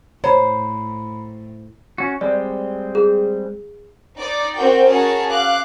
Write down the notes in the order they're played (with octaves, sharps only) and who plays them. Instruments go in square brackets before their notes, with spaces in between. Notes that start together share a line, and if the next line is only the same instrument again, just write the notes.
[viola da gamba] A2 [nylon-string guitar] C5 [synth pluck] C#5 [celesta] A#5 B5
[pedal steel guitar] C#4 F#4
[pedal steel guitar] G3 G#3 C4 [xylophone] D5
[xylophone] G#4
[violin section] D#4 D5
C4 F#4 A#4 G5
C#4 F#4 G#4 A#4 C#5 A5
F5 D6 F#6